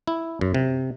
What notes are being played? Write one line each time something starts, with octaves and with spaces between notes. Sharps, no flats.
E4
F#2
C3